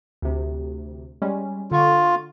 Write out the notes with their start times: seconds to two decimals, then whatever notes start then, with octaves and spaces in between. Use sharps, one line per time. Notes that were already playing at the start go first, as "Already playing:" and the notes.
0.22 D2 C3
1.22 G3 G#3 C#4
1.71 D3 F4 C#6